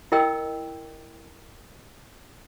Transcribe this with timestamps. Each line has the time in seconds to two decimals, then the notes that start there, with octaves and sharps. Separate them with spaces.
0.12 E4 A#4 D#5 G5 E6